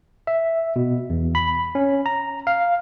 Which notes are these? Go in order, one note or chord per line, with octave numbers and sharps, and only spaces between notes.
E5
B2
E2
B5
C#4
A#5
F5